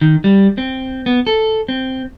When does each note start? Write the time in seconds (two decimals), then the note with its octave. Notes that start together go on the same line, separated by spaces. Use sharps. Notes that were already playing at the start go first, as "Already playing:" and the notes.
0.01 D#3
0.24 G3
0.58 C4
1.06 B3
1.27 A4
1.68 C4